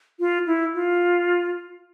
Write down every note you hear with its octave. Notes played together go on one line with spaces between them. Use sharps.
F4
E4
F4